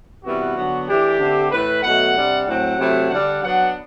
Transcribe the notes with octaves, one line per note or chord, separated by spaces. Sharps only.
C3 E3 G3 B3 F#4
D3 F#3 B3
E3 A3 D4 G4
D3 A3 C4
A2 E3 A3 B4
B2 F#3 A3 F#5
C3 G3 D4
A2 F#3 C4 F#5
C3 F#3 A3 C4 E4
D3 G3 D4 F#5
F#3 B3 D4 F#5